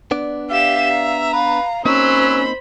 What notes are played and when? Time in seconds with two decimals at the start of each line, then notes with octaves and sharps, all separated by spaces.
0.11 B3 D4 D5
0.50 G4 E5 F5 E7
0.93 A#5
1.33 B4 F5
1.85 F#3 A#3 C4 C#4 D#4 C5 B5 E6